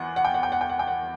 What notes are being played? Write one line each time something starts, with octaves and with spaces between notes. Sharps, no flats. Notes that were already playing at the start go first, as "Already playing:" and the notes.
Already playing: E2 F#5
F#5
G5
F#5
G5
F#5
G5
F#5
G5
F#5